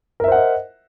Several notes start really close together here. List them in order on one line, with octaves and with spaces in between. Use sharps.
A#4 E5 C5 F#5 D#5